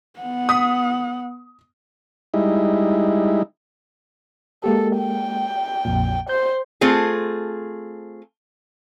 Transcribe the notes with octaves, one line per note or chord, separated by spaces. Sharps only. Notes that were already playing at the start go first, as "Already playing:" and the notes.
B3 F#5
D#6 B6
G3 G#3 D#4 E4
G#3 A#3 G4 A4
G5
A#1 F2 A#2
C5 G6
A3 C4 F4 G#4